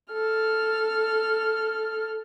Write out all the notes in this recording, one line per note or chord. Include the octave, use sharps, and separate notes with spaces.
A4 F6